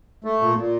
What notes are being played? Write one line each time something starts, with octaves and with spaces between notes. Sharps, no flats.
A3
A#2
A#2